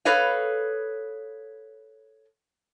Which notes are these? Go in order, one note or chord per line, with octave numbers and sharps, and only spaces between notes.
A4 B4 C#5 D#5 F5